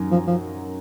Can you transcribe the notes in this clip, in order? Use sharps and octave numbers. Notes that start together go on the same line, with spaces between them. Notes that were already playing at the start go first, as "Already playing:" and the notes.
Already playing: F#2 D#3 F#3
F3
F3